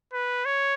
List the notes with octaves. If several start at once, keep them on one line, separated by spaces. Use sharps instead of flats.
B4
C#5